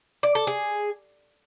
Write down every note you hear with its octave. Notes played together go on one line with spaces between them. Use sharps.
D5
A4
G#4